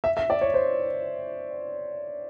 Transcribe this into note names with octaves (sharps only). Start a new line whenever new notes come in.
E5
E5
D5
C#5
C5